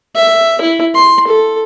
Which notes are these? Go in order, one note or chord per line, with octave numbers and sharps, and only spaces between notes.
E5
E4
C6
A4